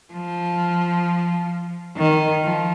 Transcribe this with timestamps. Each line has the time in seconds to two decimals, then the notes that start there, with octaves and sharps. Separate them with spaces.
0.13 F3
1.97 D#3
2.43 F3